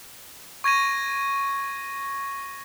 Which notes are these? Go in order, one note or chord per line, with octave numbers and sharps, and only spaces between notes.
C#6 G#6 A#6 D#7